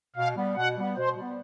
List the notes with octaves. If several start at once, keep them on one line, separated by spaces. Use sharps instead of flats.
B2 F5
G3 B3
B2 F#5
G3 B3
B2 C5
G3 B3